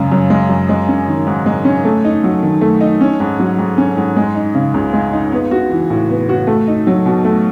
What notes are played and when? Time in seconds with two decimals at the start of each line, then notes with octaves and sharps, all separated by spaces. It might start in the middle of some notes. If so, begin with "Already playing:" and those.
Already playing: F#2 C#3 G#3
0.12 F#2
0.30 G#3
0.49 F#2
0.69 G#3
0.88 C#4
1.08 D#3
1.27 G#2
1.46 G#3
1.65 C#4
1.85 A3
2.05 D#4
2.24 F#3
2.43 D#3
2.61 A3
2.81 D#4
3.01 C#4
3.20 G#2
3.39 F#3
3.58 G#2
3.78 C#4
3.97 G#2
4.16 G#3
4.35 D#4
4.55 C#3
4.74 C#2
4.93 G#3
5.13 D#4
5.32 B3
5.51 F#4
5.70 E3
5.90 A2
6.09 B3
6.29 F#4
6.47 A3
6.68 D#4
6.87 F#3
7.06 B2
7.24 A3